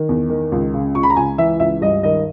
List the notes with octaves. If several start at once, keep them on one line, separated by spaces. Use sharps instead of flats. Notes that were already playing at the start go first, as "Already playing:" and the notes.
Already playing: D#3
E2
D#3
C#2
C#3
C#2 C#6
B5
A#5
C#2 G#5
E3 E5
C#2 E5
G2 D#5
D#3 D#5